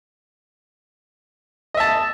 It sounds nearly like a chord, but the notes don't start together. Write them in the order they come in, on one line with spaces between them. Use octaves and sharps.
D#5 E5 A5